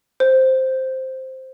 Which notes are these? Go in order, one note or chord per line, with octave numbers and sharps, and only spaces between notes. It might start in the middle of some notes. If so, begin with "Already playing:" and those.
C5